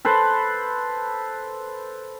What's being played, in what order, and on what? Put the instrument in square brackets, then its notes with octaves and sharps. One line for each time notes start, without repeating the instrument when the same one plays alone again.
[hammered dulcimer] A4 B4 C5